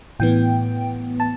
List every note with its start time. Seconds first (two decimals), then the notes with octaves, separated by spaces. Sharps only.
0.20 A2 E3 B3 G5
1.20 A5